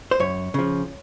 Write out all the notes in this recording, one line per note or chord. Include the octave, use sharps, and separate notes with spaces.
C5
F#2 C#5
C#3 F3